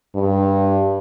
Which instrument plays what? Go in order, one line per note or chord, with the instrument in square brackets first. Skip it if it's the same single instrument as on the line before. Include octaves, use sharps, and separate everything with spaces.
[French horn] G2